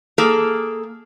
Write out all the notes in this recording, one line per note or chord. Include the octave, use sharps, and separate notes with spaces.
A#3 G#4 A4